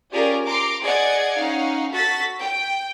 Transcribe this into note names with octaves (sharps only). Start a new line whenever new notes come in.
C#4 F4 G4 G#4 A#4 D5
A#5 C6 D6
G#4 D5 D#5 F#5 G#6
C#4 D#4 F5 F#5
F#4 A4 A6 B6
G5